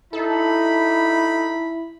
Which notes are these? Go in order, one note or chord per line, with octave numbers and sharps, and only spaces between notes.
D#4 E4 A4 B5